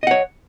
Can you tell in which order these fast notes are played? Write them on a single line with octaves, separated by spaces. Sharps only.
D#5 F#5 C#5